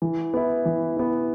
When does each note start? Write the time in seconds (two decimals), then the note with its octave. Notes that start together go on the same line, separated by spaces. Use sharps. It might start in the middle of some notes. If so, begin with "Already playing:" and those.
0.02 E3
0.34 B3 E4
0.65 E3
0.97 B3 E4